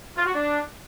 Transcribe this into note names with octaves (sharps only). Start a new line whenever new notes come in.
F4
F#4
D4